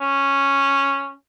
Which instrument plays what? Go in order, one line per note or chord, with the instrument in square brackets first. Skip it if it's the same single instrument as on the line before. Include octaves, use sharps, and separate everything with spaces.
[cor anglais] C#4